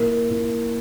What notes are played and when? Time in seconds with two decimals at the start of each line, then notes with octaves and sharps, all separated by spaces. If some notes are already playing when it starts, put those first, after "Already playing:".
Already playing: A#2 A#3 E4 A#4
0.30 A#2 A#3 E4